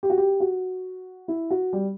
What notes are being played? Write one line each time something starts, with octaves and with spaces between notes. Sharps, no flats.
G4
F#4
G4
F#4
E4
F#4
G3